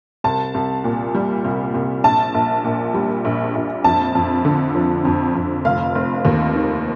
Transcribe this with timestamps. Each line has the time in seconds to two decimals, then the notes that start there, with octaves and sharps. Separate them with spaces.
0.24 C2 A5
0.54 C2
0.84 A#2
1.15 G3
1.44 C2
1.74 C2
2.04 A#1 A5
2.34 A#1
2.64 A#2
2.94 G3
3.25 A#1
3.55 A#1
3.84 F2 A5
4.15 F2
4.45 D3
4.75 F3
5.05 F2
5.35 F2
5.65 F1 F5
5.95 F1
6.25 D#2
6.55 D#3